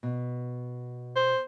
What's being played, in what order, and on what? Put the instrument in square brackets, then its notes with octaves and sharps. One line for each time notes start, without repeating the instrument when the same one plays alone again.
[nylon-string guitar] B2
[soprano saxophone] C5